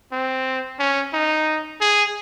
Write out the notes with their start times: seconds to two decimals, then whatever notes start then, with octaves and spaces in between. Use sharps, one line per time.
0.12 C4
0.79 C#4
1.13 D#4
1.81 G#4